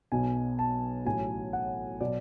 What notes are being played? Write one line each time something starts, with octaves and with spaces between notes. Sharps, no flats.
B1 B2 F#3 G#5
A5
A1 A2 F#3 G#5
F#5
B2 F#3 D5